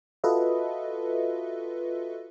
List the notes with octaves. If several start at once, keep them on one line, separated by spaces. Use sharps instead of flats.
F4 F#4 A4 B4 D#5 E5